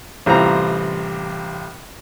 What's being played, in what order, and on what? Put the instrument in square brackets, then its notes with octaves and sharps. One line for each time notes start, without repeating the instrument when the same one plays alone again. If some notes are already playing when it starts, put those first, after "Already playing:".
[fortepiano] A1 C3 G3 C4 F4 A#5